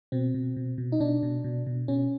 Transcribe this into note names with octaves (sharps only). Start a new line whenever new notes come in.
B2 C4
B2
B2
B2
D#4
B2 D4
B2
B2
B2
B2 C#4